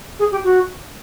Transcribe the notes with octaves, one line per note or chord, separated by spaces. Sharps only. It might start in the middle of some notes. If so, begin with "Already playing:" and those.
G#4
G4
F#4